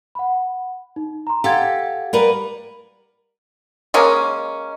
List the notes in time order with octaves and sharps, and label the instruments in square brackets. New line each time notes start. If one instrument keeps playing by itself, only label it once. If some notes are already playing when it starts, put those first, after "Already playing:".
[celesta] F#5 B5
D#4
A#5 C6
[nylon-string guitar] G4 A4 [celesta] F5 F#5 G#6
[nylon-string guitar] G3 A#4 B4
[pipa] G#3 A#3 C#4